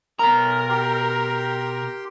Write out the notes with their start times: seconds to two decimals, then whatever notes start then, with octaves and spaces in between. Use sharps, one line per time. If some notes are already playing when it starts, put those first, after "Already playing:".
0.19 B2 A#4 A#5
0.69 G4 G5 C6